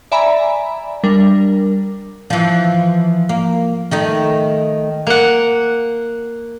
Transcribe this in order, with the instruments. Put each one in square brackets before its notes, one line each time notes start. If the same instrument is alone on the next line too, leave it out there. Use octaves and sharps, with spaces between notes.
[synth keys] D5 E5 G#5 A#5 B5
G3 D4 A#4
[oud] E3 F3
A#3
D#3 A3 D#4
[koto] A#3 F#5